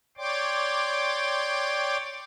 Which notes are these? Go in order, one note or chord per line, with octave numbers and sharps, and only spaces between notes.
C#5 D5 G5 C6 D6